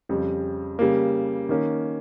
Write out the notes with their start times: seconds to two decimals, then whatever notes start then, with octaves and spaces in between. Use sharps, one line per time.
0.09 F2 C#3 G3
0.79 C#3 G3 A#3
1.49 D#3 A#3 C#4